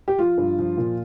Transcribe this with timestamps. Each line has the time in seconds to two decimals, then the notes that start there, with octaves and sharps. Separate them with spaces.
0.08 G4
0.18 F3 F4
0.38 G2
0.59 F3
0.77 A#2